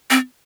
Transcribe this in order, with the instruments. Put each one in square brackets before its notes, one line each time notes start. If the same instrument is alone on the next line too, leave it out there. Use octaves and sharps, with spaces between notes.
[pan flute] C4